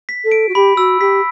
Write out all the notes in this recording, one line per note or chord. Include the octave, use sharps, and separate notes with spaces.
B6
A4
D7
F#4
G4 B5
F#4 E6
G4 B6